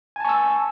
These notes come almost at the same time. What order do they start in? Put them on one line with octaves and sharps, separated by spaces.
G#5 A5 C#6 E6